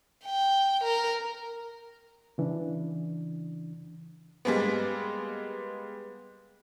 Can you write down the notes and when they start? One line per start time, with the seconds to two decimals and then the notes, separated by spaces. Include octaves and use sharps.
0.25 G5
0.83 A#4
2.38 C#3 E3 D4
4.45 G3 G#3 A#3 B3